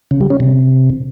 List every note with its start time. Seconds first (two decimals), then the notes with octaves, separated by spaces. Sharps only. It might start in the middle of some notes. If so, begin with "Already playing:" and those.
0.11 C#3
0.21 G3
0.30 C#4
0.40 C3